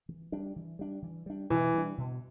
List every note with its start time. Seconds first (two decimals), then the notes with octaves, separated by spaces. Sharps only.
0.09 E3
0.32 G3 D4
0.56 E3
0.79 G3 D4
1.02 E3
1.26 G3 D4
1.50 B2 E3
1.74 G3 D4
1.98 B2